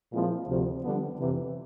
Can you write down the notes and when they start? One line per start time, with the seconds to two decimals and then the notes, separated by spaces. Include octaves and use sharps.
0.13 A#2 F3 G#3 C4 E4
0.47 D2 C3 F3
0.83 D3 G3 B3 D4
1.18 F2 C3 E3